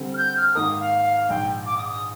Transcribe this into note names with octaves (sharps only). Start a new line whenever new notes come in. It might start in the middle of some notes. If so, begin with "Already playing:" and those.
Already playing: D3 G3 C4
F6
G6
F6
G#2 D#3 A#3 D#4 A#4 D#6
F5
A#1 G#2 D#3 G5
D6
D#6
D6
D#6